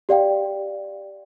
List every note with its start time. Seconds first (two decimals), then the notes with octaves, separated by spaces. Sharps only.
0.09 G4 D5 F5 G5